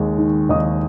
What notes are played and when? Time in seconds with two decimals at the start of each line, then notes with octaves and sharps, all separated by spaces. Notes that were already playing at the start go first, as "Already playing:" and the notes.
Already playing: D#2 G#3
0.18 D#3
0.49 D#2 D#5 D#6